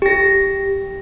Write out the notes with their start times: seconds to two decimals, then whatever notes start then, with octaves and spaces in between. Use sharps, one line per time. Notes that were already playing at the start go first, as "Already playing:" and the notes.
0.02 G4 A#6